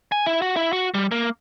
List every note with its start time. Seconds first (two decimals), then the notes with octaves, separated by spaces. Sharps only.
0.12 G#5
0.26 E4
0.42 F#4
0.57 E4
0.73 F#4
0.94 G3
1.11 A#3